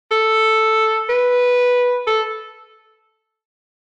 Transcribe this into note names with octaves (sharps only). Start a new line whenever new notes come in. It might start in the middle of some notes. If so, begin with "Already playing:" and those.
A4
B4
A4